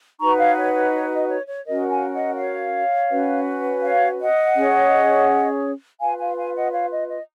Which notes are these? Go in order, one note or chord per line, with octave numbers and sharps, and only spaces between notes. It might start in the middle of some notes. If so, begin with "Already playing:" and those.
D#4 F#4 B4 A#5 C#6
C#5 F5
C#5
C#5
C#5
D#5
C#5
C#5
C#4 F#4 A#4 D#5
F5 G#5
D#5 F#5
C#5 F5
C#4 F#4 B4
C#5 F5
D#5 F#5
C#4 G#4 C#5
F4 B4 F5 G#5
F5 G#5
F5 G#5
D#5 F#5
C#5 F5
D#5
D#5